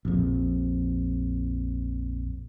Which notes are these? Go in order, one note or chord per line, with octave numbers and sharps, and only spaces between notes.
A#1 F2